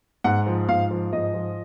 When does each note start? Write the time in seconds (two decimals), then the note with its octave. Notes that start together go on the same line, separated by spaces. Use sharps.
0.24 G#2 F#5
0.46 F3
0.69 G#2 F5
0.91 F3
1.13 G#2 D#5
1.34 F3